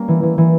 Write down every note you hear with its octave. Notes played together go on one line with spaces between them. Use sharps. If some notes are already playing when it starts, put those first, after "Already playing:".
Already playing: G3 A#3 C#4
E3
E3
E3